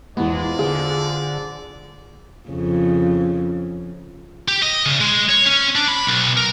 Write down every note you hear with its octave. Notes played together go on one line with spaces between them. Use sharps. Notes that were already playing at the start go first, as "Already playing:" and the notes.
E2 G#3 B3 F4 C5 D5
D3 G#4
F2 C#3
G4
D#5
C#3
G#3
C#5
C#4
D4
B5
B1
A#4